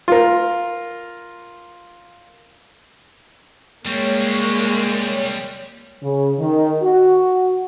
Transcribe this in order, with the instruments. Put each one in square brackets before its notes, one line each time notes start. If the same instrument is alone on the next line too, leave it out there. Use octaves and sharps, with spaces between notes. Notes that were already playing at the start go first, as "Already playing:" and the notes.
[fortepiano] F4 A#4
[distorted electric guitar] G3 C4 [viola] G#3 A#3 [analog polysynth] C#5
[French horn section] C#3
D#3
F#4